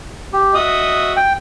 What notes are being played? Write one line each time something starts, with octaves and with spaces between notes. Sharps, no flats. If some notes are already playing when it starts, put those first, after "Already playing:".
G4
F#4 D#5 E5 D#6
G5